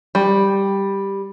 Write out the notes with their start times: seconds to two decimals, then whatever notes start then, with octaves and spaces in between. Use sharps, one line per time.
0.15 G3